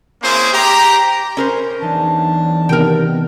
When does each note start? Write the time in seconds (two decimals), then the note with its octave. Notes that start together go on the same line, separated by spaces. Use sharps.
0.23 A#3 C4 C#4 E4 G#4 C5
0.54 G4 A#5
1.37 C#4 A#4 C5
1.81 E2 E3 F#3 D4 D#4 A5
2.69 C3 D#3 B3 A#4 G5